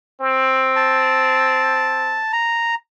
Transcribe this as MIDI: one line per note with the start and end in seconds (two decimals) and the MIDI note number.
0.20 2.23 60
0.76 2.32 81
2.33 2.75 82